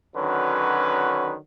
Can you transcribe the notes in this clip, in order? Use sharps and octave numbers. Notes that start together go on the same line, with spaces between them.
D3 D#3 F#3 C#4 F#4 B4